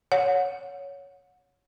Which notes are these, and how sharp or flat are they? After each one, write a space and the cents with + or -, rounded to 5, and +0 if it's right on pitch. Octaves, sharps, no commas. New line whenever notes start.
C#5 +10 F#5 -30